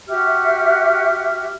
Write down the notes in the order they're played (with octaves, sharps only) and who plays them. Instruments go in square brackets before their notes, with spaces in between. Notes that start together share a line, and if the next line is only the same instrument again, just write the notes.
[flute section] F#4 G4 E5 F6